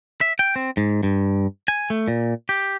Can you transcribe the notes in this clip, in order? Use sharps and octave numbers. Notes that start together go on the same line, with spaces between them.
E5
G5
C4
G#2
G2
G#5
A3
A#2
G4